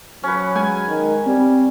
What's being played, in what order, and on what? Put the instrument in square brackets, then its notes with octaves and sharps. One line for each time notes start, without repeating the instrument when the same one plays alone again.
[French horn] F#3 [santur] C#4 B4
[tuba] G#3 [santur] G#5
[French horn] D#3
[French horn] G3 [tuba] C4